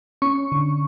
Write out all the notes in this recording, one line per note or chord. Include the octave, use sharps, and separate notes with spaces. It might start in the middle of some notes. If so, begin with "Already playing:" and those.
C#4 C#6
D3